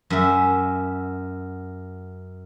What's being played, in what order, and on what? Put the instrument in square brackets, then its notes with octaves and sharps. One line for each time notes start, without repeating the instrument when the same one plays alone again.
[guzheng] F#2 E5